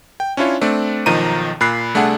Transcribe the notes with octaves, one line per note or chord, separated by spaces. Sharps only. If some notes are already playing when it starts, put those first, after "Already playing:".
G5
C#4 D4 E4 F4 C#5
A3 C4 D4
B1 D#3 F3 D#5 A#5 D#7
A#2 B5 F#6 C7
C2 A3 D4 G#4 F#5 A5